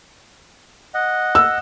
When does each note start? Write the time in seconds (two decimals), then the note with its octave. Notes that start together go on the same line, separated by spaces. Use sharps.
0.94 D#5 F#5
1.35 E6